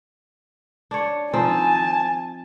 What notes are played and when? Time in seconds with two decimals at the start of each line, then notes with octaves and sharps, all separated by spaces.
0.91 D4 C#5
1.34 F3 C4 D#4 G#5 A5